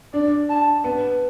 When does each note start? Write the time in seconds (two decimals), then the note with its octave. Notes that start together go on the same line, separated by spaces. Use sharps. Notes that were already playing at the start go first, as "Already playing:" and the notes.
0.13 D4 D5
0.49 A5
0.84 B3